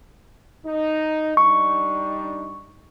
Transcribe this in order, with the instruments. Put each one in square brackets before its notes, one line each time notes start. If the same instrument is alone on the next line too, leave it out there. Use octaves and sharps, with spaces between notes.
[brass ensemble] D#4
[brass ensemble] G3 D4 D#4 [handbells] C#6